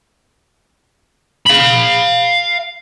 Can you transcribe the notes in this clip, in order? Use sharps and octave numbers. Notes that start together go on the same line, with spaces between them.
F5 B5